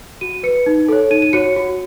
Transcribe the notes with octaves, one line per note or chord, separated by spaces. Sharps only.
F#4 D#7
B4 C#7
D#4
A4 C#5
D#4 D#7
D#7
F#4 C#5 C#7
F#4